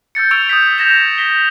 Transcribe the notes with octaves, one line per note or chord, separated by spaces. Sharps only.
E6 G6 A6 C#7
C#6 E6 G#6 D7 F7
D#6 E6 G6 B6
G6 G#6 A#6 E7 F7
E7
A#6 B6 G7